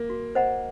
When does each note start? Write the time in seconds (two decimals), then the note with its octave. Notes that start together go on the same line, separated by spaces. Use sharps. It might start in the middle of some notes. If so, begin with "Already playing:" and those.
Already playing: A#3
0.10 F#4
0.35 C5 D#5 F#5 A#5